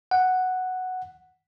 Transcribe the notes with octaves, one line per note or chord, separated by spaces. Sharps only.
F#5